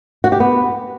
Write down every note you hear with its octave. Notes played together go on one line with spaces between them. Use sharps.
F#4
G4
B3